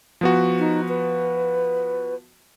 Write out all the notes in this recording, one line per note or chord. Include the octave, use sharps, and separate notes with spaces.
F3 B3 F#4
D#4
B4